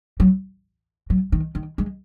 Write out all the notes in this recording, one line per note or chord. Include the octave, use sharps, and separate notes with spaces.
F#3
F#3
D#3
D#3
G#3